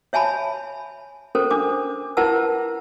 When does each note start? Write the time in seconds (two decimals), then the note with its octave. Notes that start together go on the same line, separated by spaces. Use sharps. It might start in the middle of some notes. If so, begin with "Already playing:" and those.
0.13 C#5 E5 G#5 A5 B5
1.35 C#4 A4 A#4 C5
1.51 D4 D6
2.17 E4 A#4 B4 F#5 A5 E6